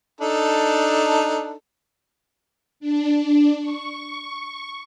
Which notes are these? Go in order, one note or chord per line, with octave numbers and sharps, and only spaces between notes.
D4 D#4 A4
D4
C#6